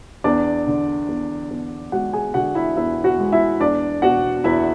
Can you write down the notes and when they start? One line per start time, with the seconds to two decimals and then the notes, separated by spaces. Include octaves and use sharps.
0.24 E2 D4 D5
0.67 D3
1.08 E2
1.50 E2
1.92 G#3 F#4 F#5
2.13 G#4 G#5
2.34 D3 F#4 F#5
2.55 E4 E5
2.77 E2 E4 E5
3.04 F#4 F#5
3.19 G#3
3.32 E4 E5
3.60 E2 D4 D5
4.02 B2 F#4 F#5
4.44 E2 E4 E5